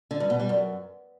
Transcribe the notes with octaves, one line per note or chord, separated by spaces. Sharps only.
D3
G2
B2
G3
F#2